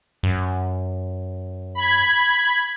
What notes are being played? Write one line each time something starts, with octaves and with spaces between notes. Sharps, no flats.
F#2
B5 G#6